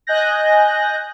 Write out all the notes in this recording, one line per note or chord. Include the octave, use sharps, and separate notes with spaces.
D#5 G#5 F#6 G6 A#6